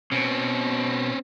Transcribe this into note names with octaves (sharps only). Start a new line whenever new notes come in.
B2 C4 C#4